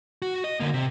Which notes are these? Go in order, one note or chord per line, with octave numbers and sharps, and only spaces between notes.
F#4
D#5
D3 A#3
C3